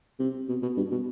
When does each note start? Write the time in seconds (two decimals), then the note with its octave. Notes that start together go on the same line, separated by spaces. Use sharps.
0.19 C3
0.49 B2
0.62 B2
0.77 G2
0.91 B2